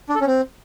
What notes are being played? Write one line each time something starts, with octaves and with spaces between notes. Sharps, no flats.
D4
A4
C#4
C4